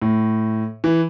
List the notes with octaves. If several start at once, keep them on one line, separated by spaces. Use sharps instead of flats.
A2
E3